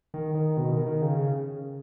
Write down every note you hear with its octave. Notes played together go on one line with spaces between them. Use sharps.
D#3
D#3
B2
D#3
D#3
C#3
C#3